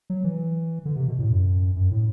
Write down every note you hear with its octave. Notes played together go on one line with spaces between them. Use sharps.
F#3
E3
D3
C3
B2
A2
F#2
F#2
A2